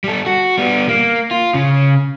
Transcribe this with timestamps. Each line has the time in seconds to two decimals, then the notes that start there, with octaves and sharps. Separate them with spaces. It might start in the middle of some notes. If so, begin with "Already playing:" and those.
0.04 G3 A4
0.26 F#4
0.58 G3 B3
0.89 A#3
1.31 F4
1.54 C#3